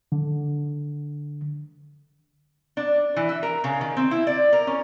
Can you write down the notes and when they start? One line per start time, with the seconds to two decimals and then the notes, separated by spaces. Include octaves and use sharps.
0.12 D3
2.77 D4
3.16 E3
3.29 E5
3.43 A#4
3.64 C#3
3.81 D#3
3.97 C4
4.11 E4
4.27 D5
4.53 A#4
4.67 C#4